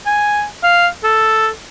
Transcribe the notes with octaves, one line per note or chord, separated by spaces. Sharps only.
G#5
F5
A4